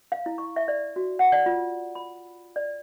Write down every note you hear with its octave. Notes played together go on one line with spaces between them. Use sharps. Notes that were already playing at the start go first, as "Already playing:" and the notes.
F5
E4
C#6
E5
D5
F#4
F#5
D5
F4
B5
D5